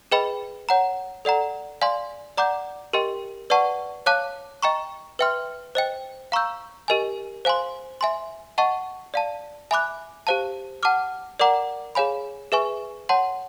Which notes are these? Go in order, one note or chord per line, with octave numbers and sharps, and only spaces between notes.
G#4 B4 D#5 G5 B5
C#5 F#5 A#5
A4 D5 F#5 A#5
D5 F5 G#5 C6
D5 F#5 A#5 D6 G6
G4 A#4 D#5 G5 C6
B4 D5 F#5 A5 C#6
C#5 F5 A5 D6 F#6
D#5 G5 A#5 C#6
B4 E5 G5 C6 F6
C5 D#5 G5
F5 A#5 C#6 E6 G6
G4 A#4 D#5 G#5
C5 F5 G#5 C6
E5 G#5 C6
D#5 F#5 A5 C#6
D5 F5 A5
E5 G#5 B5 D6 F#6
G4 C5 F5 A5
F#5 A5 D6 F6
A#4 D5 F#5 A#5 D6
G#4 C#5 F5 G#5 B5
G#4 B4 E5 G#5 C#6
C#5 F#5 A5 C6